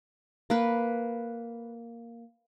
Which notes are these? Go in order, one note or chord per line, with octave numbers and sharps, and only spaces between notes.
A#3 B4